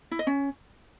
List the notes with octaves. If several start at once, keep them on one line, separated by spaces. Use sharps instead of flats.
E4
D#5
C#4